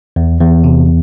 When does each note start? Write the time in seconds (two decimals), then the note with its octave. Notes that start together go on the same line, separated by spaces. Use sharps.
0.16 E2
0.41 E2
0.64 C3